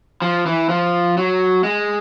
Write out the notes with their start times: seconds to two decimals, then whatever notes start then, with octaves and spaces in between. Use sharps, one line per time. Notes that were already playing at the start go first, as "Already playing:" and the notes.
0.22 F3
0.46 E3
0.69 F3
1.17 F#3
1.64 G#3